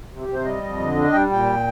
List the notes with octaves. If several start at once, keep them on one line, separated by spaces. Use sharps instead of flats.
C3
G4
C3
C5
G3 D#5
F2
D3
D4
G3 G5
A#2 G5